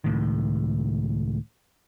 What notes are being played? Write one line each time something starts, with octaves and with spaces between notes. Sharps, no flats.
C#2 A2 D#3